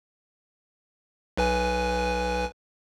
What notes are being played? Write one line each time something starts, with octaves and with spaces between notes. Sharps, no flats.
B1 B4 G#5